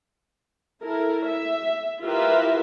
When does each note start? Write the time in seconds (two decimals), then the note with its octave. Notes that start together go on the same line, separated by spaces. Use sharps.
0.83 E4 A4 A#4
1.27 E5
2.02 E4 F4 G4 A#4 B4 E5